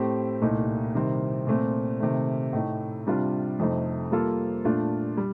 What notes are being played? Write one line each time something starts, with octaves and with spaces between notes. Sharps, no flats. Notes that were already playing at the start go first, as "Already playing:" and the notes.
Already playing: A2 A3 C4 G4
C2 A#2 A3 D#4
C3 D#3 G3 C4
A#2 A3 C4
C3 D#3 A3
A2 A3 D#4
C3 G3 D4 F4
F2 C3 F3 A3 D#4
G3 A#3 F4 A4
A#2 A3 D4 F4
G3